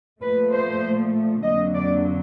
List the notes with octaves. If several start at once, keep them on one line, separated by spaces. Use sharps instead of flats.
A#2 F3 A3 B4
C5
F2 D3 F#3 A#3 D#5
D5